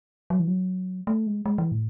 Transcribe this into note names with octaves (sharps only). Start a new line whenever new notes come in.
F#3
E3
F#3
A3
G#3
G#3
E3
A2